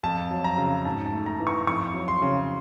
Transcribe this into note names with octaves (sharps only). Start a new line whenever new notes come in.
F2 A5
F#3
A#5
C#3
G#2 A5
A5
A3
A#5
E3
C#6
F2 C#6
F#3
C6
C#3